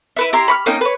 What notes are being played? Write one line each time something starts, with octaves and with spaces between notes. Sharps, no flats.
E4 B4 E5
E4 G4 A#5 C6
B5 C#6 F6
A#3 C#4 D#4 G5
B4 C#5